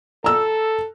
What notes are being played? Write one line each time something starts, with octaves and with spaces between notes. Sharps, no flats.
A4 A#5 E6